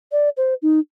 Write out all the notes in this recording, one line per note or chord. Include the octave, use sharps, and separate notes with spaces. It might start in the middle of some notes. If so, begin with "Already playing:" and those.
D5
C5
D#4